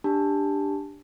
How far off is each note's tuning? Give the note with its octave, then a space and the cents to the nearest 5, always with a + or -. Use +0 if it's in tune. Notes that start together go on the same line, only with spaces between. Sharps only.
D4 +0 G4 +10 A5 +0